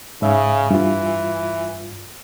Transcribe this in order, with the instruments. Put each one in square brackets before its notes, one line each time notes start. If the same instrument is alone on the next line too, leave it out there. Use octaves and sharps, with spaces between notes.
[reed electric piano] G#2 E5 [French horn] C#3
[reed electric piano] G2 F4 [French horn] E3